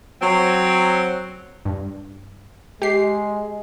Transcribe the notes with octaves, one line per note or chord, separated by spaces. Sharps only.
F#3 C4
G2
G#3 G4 C7